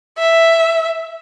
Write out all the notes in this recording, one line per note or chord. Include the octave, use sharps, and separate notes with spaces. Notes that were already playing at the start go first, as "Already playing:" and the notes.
E5